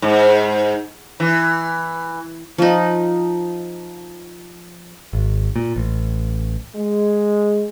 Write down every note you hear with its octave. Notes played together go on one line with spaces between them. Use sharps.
G#2
E3
F3 D#4
G#1
A#2
A1
G#3